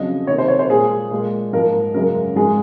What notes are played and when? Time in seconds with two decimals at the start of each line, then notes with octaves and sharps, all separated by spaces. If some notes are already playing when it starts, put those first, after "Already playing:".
Already playing: F2 C#3 F#3 D#5
0.27 C3 D#3 A#3 C#5
0.38 C5
0.48 C#5
0.59 C5
0.69 A#2 G#3 G#4
1.11 A#2 G#3
1.53 G#2 F3 A#3 A#4
1.94 F#2 C#3 G#3 A#4
2.36 G#2 F3 G#3 G#4